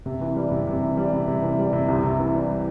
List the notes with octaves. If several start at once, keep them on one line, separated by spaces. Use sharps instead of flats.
C3
E3
G3
C3
C3
E3
G3
C3
C3
E3
G3
C3
C2
C3
E3
G3